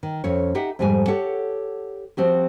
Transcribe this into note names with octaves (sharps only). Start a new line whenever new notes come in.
D#3
F2 C#4 C#5
D#4 G4 E5 F#5
F2 G#2 G3 G#3 G#5
G4 A4 C#5 F#5 A5
F3 C4 F#4 G4